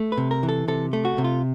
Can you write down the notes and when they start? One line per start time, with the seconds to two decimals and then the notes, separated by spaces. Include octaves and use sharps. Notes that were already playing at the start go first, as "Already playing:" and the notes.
Already playing: A3
0.12 B4
0.18 C3
0.31 A#4
0.43 E3
0.49 A4
0.68 C3 A4
0.93 A3
1.05 F#4
1.18 C3
1.24 F4